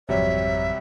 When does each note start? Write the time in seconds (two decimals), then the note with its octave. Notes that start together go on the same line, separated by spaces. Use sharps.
0.09 G#1 F2 C3 F#3 G3 C#5 E5